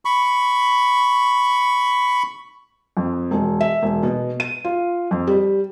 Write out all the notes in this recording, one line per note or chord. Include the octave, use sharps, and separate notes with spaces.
B5 C#6
F2
E1
E5
E1
B2
D#7
F4
F2
G3